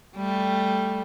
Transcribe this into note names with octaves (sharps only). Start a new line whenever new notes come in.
G3 A3